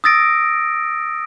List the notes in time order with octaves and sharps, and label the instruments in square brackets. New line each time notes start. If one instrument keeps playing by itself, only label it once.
[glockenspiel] D#6 E6 A6 A#6 D7